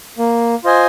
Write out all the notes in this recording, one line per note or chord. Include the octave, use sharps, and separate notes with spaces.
A#3
F4 C5 D#5 G#5